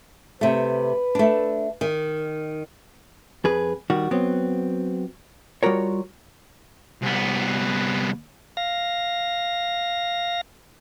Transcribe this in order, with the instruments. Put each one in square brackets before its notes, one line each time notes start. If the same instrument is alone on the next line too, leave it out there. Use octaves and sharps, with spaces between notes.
[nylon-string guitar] C3 A3 [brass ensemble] B4
[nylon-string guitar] A3 D4
D#3
[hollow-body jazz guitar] F2 G#4 B4
D#3 G3 F#4
F#3 B3 C4
G3 F4 F#4 A#4 C#5
[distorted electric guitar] C2 B3
[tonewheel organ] F5 A#6